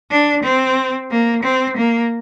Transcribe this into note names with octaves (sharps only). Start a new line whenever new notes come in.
D4
C4
A#3
C4
A#3